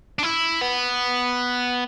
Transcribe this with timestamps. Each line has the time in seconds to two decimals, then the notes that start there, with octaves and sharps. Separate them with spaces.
0.19 D4
0.23 E4
0.61 B3